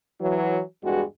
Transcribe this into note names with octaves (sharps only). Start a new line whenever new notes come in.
E3 F#3
E2 G2 G3 G#3 F#4